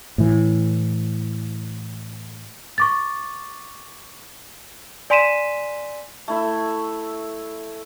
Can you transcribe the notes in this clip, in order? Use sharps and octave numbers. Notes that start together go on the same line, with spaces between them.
A2 E3
C#6 D6 A6
D5 G#5 C6 B6 D#7 E7
A3 E4 E5